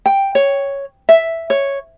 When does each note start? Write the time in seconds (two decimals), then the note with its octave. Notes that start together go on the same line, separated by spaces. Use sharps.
0.06 G5
0.35 C#5
1.09 E5
1.50 C#5